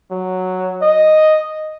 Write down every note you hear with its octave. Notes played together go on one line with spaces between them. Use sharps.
F#3
D#5